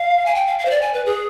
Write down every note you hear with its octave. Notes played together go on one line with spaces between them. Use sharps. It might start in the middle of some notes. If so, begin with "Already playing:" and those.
Already playing: F5
G#5
G5
F5
F5
C5
D5
G#5
B4
G#4